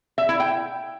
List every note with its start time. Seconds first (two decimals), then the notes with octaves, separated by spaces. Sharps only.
0.18 E5
0.29 E4
0.40 G5